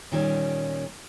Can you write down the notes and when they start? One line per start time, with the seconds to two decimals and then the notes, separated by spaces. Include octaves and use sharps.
0.12 A#2 D#3 G3 C#4